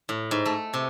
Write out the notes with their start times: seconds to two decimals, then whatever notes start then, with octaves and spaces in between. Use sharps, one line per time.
0.09 A2
0.31 G#2
0.46 A3
0.74 C3